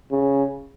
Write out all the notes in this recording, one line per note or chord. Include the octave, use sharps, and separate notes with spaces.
C#3